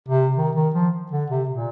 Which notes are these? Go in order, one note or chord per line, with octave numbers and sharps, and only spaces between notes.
C3
D#3
D#3
F3
D3
C3
A#2